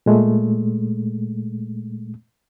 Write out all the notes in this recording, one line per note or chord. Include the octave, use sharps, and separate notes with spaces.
A#2 G#3 A3